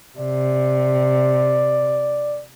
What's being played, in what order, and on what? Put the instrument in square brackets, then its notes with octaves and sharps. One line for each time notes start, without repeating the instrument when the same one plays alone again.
[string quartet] C3 [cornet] D5